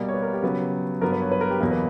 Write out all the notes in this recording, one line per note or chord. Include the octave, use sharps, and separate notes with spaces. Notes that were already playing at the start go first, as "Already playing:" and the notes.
Already playing: B2 G3 A#3 D5
C#5
B4
A#4
G4
C#3 F#3 B3
G2 F#3 B3 A#4
B4
C#5
B4
A#4
G4
E2 B2 F#3 A#3 A#4
B4